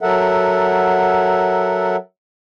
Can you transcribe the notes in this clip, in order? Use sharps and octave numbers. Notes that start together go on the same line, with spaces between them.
F#3 A4 A#4 E5 F#5